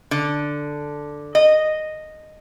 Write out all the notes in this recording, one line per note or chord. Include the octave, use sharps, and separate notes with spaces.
D3
D#5